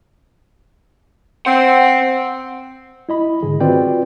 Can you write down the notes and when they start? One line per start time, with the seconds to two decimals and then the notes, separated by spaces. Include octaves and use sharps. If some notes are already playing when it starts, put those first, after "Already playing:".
1.46 C4 F#5
3.09 E4 D#5 B5
3.43 G#2 D3 D#3 G#4
3.60 C4 F4 F#4 B4 D5 G5